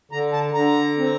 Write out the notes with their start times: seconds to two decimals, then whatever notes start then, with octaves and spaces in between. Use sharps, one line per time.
0.11 D3 A#5
0.33 A5
0.54 D3 A#5
0.98 C4